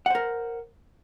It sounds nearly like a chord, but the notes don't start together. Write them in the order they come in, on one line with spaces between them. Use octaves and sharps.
F#5 C5 A#4